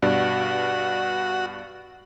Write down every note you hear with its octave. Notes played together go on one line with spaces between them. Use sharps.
G2 B2 F#4 D5